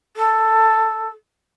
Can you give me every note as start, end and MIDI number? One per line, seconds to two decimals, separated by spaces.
0.17 1.09 69